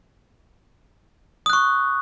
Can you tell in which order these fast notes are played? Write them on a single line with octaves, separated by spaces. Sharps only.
D#6 F#6 C#6